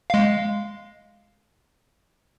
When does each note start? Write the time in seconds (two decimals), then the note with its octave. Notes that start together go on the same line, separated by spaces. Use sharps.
0.10 G#3 F5